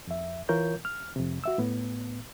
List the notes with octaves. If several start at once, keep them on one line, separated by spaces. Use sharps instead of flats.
F2 E5
E3 F4 A#4 C#5 G6
F6
F2 C3
F#4 E5 E6
A2 B3